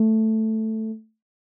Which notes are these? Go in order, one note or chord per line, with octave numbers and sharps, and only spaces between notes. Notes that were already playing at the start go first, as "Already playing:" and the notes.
Already playing: A3